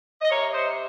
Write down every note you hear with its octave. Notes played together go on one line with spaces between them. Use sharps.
D#5
C3 A#4 C#5
C5 D#5